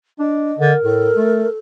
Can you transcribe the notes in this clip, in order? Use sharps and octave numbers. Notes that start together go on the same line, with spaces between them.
D4 D#5
D3 A#4
A2 A4
A3